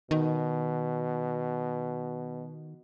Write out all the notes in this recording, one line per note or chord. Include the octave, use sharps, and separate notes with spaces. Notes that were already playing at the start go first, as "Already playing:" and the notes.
B2 D#3